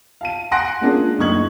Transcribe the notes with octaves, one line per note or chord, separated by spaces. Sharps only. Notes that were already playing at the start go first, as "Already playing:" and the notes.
F5 A5 D#7
F#5 G#5 C6 F#6 A#6 D7
G#3 A#3 C#4 D4 F4 G#4
F#1 D2 D#4 C#6 G#6 F#7